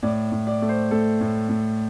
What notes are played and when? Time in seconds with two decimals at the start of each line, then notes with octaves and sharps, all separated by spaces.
0.03 A2 D5
0.32 A2
0.47 D5
0.62 A3
0.69 C5
0.91 A3 A4
1.21 A2
1.49 A2